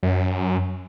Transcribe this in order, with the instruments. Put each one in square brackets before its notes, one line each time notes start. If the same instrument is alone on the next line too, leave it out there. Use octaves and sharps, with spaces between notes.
[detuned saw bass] F#2